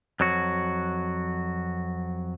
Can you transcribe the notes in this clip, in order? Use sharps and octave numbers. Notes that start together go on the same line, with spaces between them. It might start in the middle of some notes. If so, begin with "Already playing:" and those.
F2 F#3 F#4